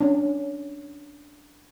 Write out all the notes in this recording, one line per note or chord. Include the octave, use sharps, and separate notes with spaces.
C#4 D4